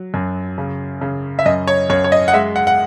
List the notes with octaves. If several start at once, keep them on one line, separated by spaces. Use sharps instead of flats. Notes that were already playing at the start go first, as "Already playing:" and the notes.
Already playing: F#3
F#2
C#3
C#3
E5
F#2 D#5
C#5
F#2 C#5
C#5
D#5
F#5
G#3 E5
F#5
F#5